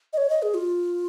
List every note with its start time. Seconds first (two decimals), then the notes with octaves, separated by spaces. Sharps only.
0.13 D#5
0.17 C#5
0.30 D#5
0.42 G#4
0.54 F4